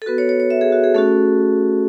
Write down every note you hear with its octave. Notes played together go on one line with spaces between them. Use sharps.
A4
B3 F#4 B4
C#5
C#5
C#5
E5
G#4
F#4
G#4
A3 C#4 F#4 A4